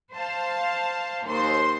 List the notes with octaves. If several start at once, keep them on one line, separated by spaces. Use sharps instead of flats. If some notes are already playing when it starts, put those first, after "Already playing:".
C5 F5 A5
D#2 C5 C6